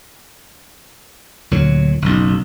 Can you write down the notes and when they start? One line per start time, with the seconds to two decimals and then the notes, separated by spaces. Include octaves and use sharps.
1.51 D2 A#2 F#3
2.02 F#1 B1